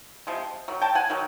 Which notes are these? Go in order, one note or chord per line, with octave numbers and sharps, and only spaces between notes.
C3 F3 G#3
D#3 F#3
G5 A5
F#5 G#5
D#3 F#3